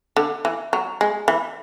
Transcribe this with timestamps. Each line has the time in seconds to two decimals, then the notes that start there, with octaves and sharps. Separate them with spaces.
0.16 D3
0.45 E3
0.73 F#3
1.01 G#3
1.28 E3